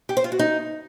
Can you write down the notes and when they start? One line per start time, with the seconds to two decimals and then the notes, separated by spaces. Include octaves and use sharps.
0.09 G4
0.17 C5
0.24 F4
0.32 F#4
0.39 D#4